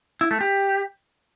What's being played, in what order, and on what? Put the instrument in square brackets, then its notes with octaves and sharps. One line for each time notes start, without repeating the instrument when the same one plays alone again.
[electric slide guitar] E4
A3
G4